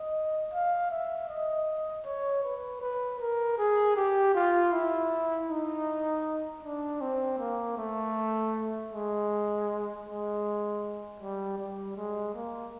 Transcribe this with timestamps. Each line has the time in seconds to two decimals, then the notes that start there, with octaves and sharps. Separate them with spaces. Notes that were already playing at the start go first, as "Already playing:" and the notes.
Already playing: D#5
0.53 F5
0.91 E5
1.29 D#5
2.05 C#5
2.44 B4
2.82 B4
3.20 A#4
3.58 G#4
3.96 G4
4.35 F4
4.72 E4
5.49 D#4
6.63 D4
7.01 C4
7.39 A#3
7.77 A3
8.92 G#3
10.06 G#3
11.20 G3
11.58 G3
11.97 G#3
12.35 A#3